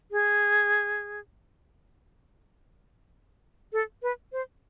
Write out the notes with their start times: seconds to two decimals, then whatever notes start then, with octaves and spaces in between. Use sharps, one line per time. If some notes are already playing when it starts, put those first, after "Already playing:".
0.11 G#4
3.73 A4
4.03 B4
4.32 C5